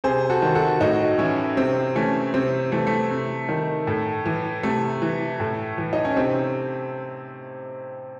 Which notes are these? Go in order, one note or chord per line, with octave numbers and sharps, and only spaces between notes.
C3 G#4 C5
F#4 A4
D#3
F#4 A4
A2 D#4 F#4
E3 C#4 E4
C3 C4
E3 A3 C#4
C3 C4
E3 A3
A3
C3
D#3
A2
E3
C3 A3
E3
A2
E3
D#4
C#4
C3 C4